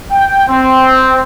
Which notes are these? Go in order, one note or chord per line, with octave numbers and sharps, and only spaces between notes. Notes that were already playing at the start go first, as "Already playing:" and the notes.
G5
C4